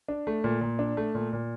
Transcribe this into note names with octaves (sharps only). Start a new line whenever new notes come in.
D4
A3
A#2
A#2
D4
A3
A#2
A#2